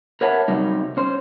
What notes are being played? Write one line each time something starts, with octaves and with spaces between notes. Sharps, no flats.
A#4 B4 C#5 E5 F#5 A5
C3 F#3 G3 D#4
C#4 C5